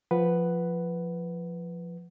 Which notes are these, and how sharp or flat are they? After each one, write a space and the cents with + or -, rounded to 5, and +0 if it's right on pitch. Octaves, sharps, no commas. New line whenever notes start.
F3 +0 B4 +0 F#5 +10